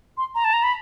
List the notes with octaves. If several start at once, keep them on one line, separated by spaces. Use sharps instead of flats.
C6
A#5
A5
A#5
B5